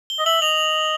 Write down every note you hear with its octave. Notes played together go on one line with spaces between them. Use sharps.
G7
D#5
E5 F#7
D#5 F7